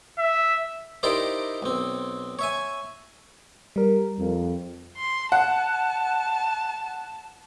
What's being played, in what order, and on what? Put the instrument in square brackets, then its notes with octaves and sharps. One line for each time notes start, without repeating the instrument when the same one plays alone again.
[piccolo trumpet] E5
[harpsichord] D#4 E4 G4 A#4 C5 D5
B1 C4
C#5 E5 G#5
[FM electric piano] G3 A#4
[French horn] F2
[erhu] C6
[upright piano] F#5 [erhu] A5